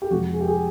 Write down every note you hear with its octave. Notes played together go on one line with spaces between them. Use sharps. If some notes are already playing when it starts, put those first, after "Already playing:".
G4
F2 C3 F3 G#3 F#4
G#4
G4
G#4